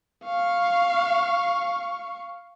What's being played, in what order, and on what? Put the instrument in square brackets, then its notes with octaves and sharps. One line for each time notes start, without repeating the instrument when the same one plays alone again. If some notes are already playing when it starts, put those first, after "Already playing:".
[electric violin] F5 C#6